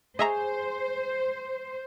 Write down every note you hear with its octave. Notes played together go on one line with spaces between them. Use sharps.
G#4 C5 C#5 D#5 E5 A#5